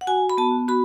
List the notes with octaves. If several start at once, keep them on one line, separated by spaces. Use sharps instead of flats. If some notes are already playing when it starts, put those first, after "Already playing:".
F#5
F#4 G#5
B5
B3 A5
F#4 B5